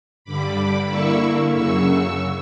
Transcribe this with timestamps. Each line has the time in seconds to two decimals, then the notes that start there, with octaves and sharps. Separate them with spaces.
0.24 G2 D3 G3 B5 D6
0.89 D3 A#3 E4 C#6 E6
1.52 F#2 C#3 F#3 C#6 E6